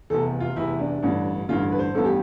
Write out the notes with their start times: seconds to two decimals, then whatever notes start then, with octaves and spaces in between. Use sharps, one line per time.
0.10 F1 E2 C3 A4
0.40 F4
0.56 F1 E2 C3 E4
0.79 D4
1.02 A1 G2 D3
1.49 A1 G2 D3 F4
1.72 B4
1.79 C5
1.94 A1 G2 F3 B3 A4
2.05 G4